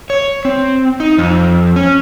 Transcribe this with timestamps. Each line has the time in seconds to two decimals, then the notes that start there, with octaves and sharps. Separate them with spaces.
0.10 C#5
0.45 C4
1.00 D#4
1.18 F2
1.76 C#4